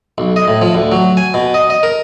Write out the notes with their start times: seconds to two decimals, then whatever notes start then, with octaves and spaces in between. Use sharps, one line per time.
0.18 B1
0.36 D#5
0.48 A2
0.61 F3
0.75 D2
0.92 F#3
1.17 G#5
1.34 B2
1.54 D#5
1.70 D#5
1.83 A#4